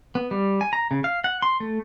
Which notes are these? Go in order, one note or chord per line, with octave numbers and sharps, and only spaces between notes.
B3
G3
G#5
A#5
C#3
F5
F#5
C6
A3